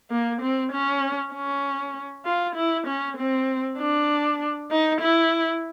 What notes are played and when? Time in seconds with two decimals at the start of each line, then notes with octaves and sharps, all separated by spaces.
0.11 A#3
0.41 C4
0.72 C#4
1.33 C#4
2.25 F4
2.55 E4
2.87 C#4
3.17 C4
3.79 D4
4.71 D#4
5.01 E4